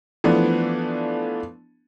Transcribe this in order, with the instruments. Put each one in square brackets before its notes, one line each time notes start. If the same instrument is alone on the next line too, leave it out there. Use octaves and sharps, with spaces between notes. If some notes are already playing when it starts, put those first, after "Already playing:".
[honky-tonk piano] E3 F3 A3 B3 D4